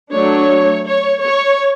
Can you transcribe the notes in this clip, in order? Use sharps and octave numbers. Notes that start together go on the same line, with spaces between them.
F#3 A3 D4 C#5
C#5
C#5